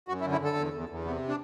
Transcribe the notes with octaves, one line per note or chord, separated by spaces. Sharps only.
F#2 F#4
E4
D3
E4
D3 A4
E2
E2
E2
C3 B3
D4